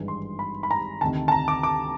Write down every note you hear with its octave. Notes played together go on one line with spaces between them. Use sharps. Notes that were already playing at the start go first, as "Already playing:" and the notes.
Already playing: G#1 G2 E3 G#3
C6
B5
B5
A#5
D2 C3 D#3 A5
A5
A#5
D6
D6